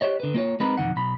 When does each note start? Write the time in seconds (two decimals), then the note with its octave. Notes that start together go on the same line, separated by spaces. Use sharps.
0.01 G4 C5 C#5 D#5
0.20 D3 B4
0.34 A#3 F4 C#5
0.60 G#3 C4 D#4 A#4 B4 B5
0.77 B1 F2 A#2 D#3 F#5
0.96 B1 B5